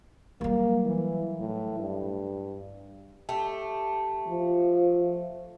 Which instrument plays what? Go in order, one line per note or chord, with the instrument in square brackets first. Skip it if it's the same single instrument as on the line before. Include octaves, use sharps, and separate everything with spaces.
[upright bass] F#3 G3 [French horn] A#3
[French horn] E3
A2
G2
[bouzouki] A3 G4
[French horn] F3